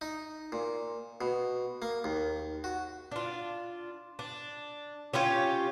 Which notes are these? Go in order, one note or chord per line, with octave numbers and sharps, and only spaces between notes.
D#4
A#2
B2
A#3
D#2
F#4
D4 F4
D4
C#4 F4 G4 C#5